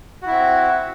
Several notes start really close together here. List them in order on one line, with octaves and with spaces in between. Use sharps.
F#4 E4 C4